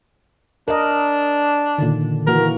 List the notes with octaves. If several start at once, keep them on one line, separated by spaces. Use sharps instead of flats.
D4 A#4 D#5
A#2 D3 D#3
E3 A#3 F#4 A#4